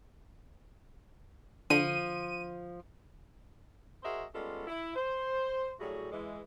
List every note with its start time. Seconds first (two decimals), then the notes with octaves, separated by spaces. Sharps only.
1.70 D3 F3 D#7
4.03 F#4 G#4 A#4 C5 D#5 E5
4.35 G3 G#3 B3 C#4 F4 A4
4.67 E4
4.95 C5
5.80 A2 F#3 G3 A3 F#4 G#4
6.12 E3 G#3